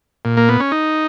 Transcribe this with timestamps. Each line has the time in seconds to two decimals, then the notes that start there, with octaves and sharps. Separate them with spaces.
0.25 A#2
0.37 A#3
0.49 B3
0.60 C#4
0.72 D#4